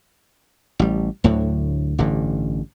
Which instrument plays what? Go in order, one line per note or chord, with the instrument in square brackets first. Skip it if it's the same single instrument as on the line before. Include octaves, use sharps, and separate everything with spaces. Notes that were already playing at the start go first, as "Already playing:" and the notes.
[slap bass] A1 G3
D2 A2 D3 F#3
A1 G2 D3